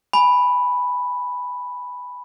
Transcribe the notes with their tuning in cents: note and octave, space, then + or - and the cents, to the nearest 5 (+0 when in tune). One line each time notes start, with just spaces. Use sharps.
G#5 +0 B5 +0